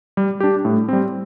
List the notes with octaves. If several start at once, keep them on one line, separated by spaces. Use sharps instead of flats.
G3
D4 G4
A2
G3 C4